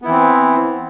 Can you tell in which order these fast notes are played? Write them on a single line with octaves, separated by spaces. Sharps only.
B3 E4 E3 C4